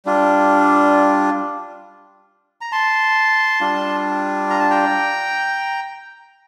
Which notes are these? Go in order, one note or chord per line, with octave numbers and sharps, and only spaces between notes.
G3 D4 F4
A#5
A5 C6
G3 D4 F4
A#5
A5
G5 A#5